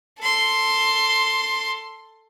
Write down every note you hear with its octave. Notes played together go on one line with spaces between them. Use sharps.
A4 C6